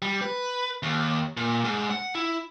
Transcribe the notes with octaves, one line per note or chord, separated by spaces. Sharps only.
G3
B4
D#2
A#2
G#2
F#5
E4